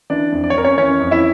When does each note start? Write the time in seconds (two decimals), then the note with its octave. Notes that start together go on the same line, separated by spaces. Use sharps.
0.10 E3 D4 D5
0.32 F2
0.44 D5
0.50 C#5
0.56 F2 A#4
0.65 C#4 C#5
0.77 E3 C#4 C#5
1.00 F2
1.11 E4 E5